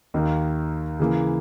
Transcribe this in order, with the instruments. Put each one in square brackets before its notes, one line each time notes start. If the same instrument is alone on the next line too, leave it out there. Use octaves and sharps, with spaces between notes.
[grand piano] D#2 D#3 A#3
C#3 E3 A#3